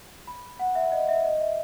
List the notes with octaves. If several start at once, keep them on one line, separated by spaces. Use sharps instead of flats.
B5
F#5
E5
D#5
E5
D#5
E5